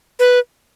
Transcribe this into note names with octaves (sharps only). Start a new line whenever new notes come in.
B4